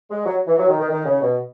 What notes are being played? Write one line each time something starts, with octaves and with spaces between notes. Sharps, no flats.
G#3
F#3
E3
F#3
D#3
D#3
D#3
C#3
B2